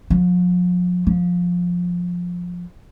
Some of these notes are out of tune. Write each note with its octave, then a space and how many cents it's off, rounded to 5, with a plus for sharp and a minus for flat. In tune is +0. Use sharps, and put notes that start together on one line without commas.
F3 +40
F3 +15